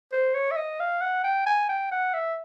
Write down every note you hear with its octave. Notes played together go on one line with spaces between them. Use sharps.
C5
C#5
E5
D#5
F5
F#5
G5
G#5
G5
F#5
E5